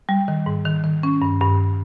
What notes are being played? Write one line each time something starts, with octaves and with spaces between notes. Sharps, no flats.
G3
D#3
G#2
D#3
D#3
C#4
G2
G2